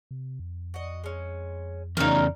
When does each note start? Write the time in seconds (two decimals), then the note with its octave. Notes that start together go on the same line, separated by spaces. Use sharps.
0.11 C3
0.39 F2
0.74 F#4 D#5
1.04 G#3 C#4
1.97 E2 C#3 C4 D4 D#4 F4 A#4